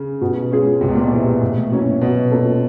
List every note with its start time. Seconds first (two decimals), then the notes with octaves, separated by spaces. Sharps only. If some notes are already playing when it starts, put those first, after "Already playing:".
Already playing: C#3
0.21 B2
0.51 G#3 C#4 F4 G#4
0.81 C#2 C3
0.88 B2
0.95 A#2
1.03 B2
1.12 C3 E3 G#3
1.41 A2
1.71 F#3 A#3 C#4 E4
2.01 B2 F#3
2.31 A#3 C#4 F4 A4